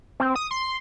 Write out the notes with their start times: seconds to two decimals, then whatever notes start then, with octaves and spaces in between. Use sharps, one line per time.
0.20 C4
0.36 D#6
0.51 C6